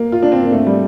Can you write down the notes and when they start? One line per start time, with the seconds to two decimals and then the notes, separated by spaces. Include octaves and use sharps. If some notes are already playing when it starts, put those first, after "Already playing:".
Already playing: A#3
0.12 F4
0.22 D4
0.32 C4
0.43 A#3
0.52 A3
0.67 G3